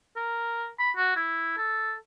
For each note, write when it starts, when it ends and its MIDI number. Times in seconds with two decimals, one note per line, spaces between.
0.16 0.69 70
0.79 0.91 83
0.97 1.14 66
1.16 1.56 64
1.58 1.95 69